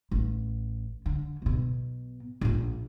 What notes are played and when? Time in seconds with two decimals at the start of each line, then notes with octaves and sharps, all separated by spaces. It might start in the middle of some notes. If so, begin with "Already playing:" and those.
0.11 A1
1.06 D3
1.42 B1 B2
2.41 A#1 A#2